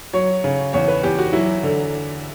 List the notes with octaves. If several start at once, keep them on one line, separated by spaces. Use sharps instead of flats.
F#3 C#5
C#3
E2 C#5
B4
E2 G4
F#4
F#3 E4
D3